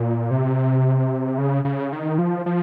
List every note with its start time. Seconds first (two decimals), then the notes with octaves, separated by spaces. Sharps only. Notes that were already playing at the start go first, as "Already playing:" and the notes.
Already playing: A#2
0.31 C3
1.38 C#3
1.65 C#3
1.93 D#3
2.18 F3
2.46 F3